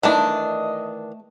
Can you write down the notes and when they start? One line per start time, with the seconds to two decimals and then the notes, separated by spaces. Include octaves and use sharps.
0.03 D#3 E3 A3 D4 D#5 A5